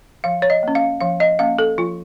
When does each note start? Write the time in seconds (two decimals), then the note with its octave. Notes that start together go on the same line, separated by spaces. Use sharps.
0.24 F3 F5
0.42 C#5
0.50 D#5
0.63 A#3 C#4
0.75 F5
1.01 F3 F5
1.20 D#5
1.39 A#3 C#4 F5
1.59 A4
1.78 F3 F4